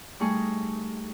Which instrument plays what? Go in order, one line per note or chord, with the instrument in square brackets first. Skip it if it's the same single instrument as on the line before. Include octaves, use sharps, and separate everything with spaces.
[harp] G3 A3 D#4 G#4 C#6